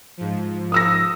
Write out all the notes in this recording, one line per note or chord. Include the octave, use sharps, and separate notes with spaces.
G#2 F3
D#6 E6 A#6